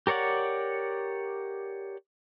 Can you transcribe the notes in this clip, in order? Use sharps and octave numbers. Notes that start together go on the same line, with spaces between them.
G4 A#4 C#5 D5 F#5